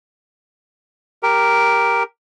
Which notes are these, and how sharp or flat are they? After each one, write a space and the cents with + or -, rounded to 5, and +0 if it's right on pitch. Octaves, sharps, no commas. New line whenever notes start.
G4 +0 A#4 +0